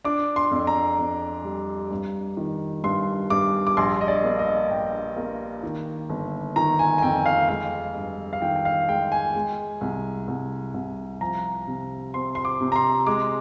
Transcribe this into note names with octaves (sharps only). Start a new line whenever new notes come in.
D4 D6
C6
F2
A#5
F2
G3
G2
D#3
G2 C6
G2 D6
D6
A#1 C6
D#5
D5
A#3
D#5
A#1 G5
A#3
D#3
G1
D#3 A#5
G#5
G#5
F2 G5
F5
G#3 F5
G2
F5
D#3 G5
G5
F5
G#3 G5
G#5
G#3
C2
C2
C2
F3 A#5
C3
C4 C6
C6
D6
C3
A#5
C6
G#3 D6